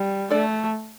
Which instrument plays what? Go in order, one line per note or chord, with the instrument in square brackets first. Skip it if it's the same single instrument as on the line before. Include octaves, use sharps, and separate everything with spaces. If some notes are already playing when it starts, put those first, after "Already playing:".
Already playing: [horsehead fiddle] G3
[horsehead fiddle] A3 [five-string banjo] D4 A4 D5